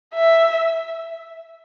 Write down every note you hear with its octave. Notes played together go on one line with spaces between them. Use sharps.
E5